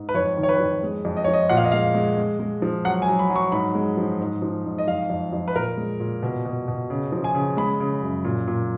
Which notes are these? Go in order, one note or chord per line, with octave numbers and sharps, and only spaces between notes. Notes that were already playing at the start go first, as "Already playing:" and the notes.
Already playing: G#2
B4
F2 C#5
D#3
C#5
B4
F2
G#3
F2
D#5
F3 C#5
D#5
A#2 F#5
F5
D#5
G#3 F5
G#3
G#3
G#3
F3
F#3 F#5
G#5
F#3
B5
F#3
C#6
G#2 B5
G#3
F3
G#2
F3
G#2
D#5
F2 F5
F2
F2
B4
A#2 A#4
G#3
A#2
B2
B2
B2
C#3
F3
G#5
C#3
G#3 B5
C#3
F#2
A#2
A#2